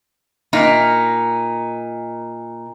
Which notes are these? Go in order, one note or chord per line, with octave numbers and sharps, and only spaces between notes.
A#2 D#4